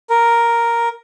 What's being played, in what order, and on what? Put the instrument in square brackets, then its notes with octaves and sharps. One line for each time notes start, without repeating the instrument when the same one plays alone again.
[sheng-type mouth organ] A#4